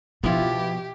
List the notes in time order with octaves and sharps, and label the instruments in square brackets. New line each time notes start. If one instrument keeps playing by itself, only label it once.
[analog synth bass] B2 [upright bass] F3 [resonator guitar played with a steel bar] B3 E4 F4 [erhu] G4